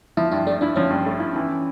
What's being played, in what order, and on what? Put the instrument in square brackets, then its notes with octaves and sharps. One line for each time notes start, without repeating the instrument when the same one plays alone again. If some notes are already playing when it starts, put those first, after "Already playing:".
[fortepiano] F3 [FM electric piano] E4
[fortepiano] G2 [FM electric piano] E4
[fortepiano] A3 [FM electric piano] D4
[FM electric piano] D4 [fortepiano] E4
[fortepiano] F3 [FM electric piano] C#4
[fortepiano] G2
A3
E4
E3